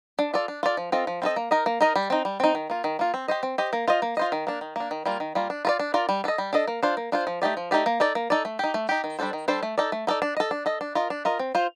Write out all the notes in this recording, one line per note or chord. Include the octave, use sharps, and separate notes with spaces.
D4
F4 A4 D5
D4
F4 A4 D5
F3
C4 F4 A4 D#5
F3
C4 F4 A4 D#5
A#3
D#4 A#4 D#5
A#3
D#4 A#4 D#5
G3
C4 D#4
G3
C4 D#4
D#3
A#3 F4
D#3
A#3 F4
C4
G4 C5 D#5
C4
G4 C5 D#5
A#3
F4 C5 D#5
A#3
F4 C5 D#5
D#3
A#3 D4
D#3
A#3 D4
D#3
G3 A#3 F4
D#3
G3 A#3 F4
D4
F4 A#4 D5
D4
F4 A#4 D5
G3
D4 A4 D#5
G3
D4 A4 D#5
A#3
D4 F4 C5
A#3
D4 F4 C5
F3
A3 D#4 G4 D5
F3
A3 D#4 G4 D5
A#3
D#4 A4 D5
A#3
D#4 A4 D5
A3
D#4 G4
A3
D#4 G4
D#3
G3 D4 A4 C5
D#3
G3 D4 A4 C5
A3
D#4 A4 D5
A3
D#4 A4 D5
D4
A4 D#5
D4
A4 D#5
D4
F4 A#4 D#5
D4
F4 A#4 D#5
C4
F4 C5